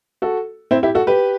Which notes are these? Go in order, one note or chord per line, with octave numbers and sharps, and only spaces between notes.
F#4 A4
C4 E4
E4 G4
F#4 A4
G4 B4